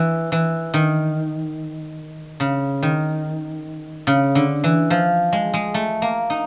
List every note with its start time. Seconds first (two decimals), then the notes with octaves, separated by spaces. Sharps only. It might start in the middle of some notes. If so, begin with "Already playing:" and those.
Already playing: E3
0.32 E3
0.74 D#3
2.40 C#3
2.83 D#3
4.07 C#3
4.35 D3
4.64 E3
4.90 F3
5.33 G#3
5.54 G#3
5.74 A3
6.02 A#3
6.30 D#4